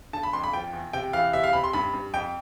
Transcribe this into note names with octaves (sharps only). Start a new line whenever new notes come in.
D3 A5
B5
F2 C6
B5
F3 G5
E2
C3 G5
E3 F5
C3 E5
F5
C3 B5
C6
G2 B5
G2
F2 G5